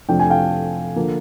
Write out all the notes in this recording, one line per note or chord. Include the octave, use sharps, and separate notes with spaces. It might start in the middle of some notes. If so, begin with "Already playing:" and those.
F2 C3 F3 A3 D4 G5
G#5
F5 G5
D3 F3 A#3